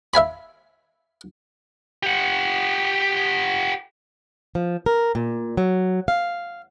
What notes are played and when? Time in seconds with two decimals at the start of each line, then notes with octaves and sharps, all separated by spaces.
0.14 E5 F5 G#5 B5
2.03 G4 F#5
4.55 F3
4.86 A#4
5.15 A#2
5.57 F#3
6.08 F5